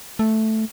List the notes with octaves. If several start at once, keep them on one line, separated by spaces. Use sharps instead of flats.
A3